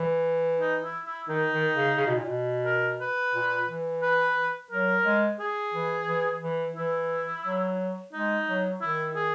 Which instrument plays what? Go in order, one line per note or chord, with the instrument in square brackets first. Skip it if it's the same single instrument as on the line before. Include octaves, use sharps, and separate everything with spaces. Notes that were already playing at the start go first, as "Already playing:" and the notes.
Already playing: [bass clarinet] E3
[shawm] D#4
E4
E4
[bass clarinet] D#3 [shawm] D#4
[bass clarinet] D#3
C#3
C#3
B2
A#2
B2
[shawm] A#4
B4
[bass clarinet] A#2
E3
[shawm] B4
[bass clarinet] F#3 [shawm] A#4
[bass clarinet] G#3
[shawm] G#4
[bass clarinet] E3
E3
E3
[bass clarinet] E3 [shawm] E4
[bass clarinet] F#3
[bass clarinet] G#3 [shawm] D#4
[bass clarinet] F#3
[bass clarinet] D#3 [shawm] E4
[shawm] G#4